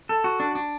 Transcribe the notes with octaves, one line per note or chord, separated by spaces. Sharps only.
A4
F#4
D4
D4